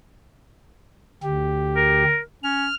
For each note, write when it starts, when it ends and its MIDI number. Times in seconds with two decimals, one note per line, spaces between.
1.23 2.04 38
1.23 2.04 67
1.76 2.19 70
2.43 2.67 61
2.43 2.74 89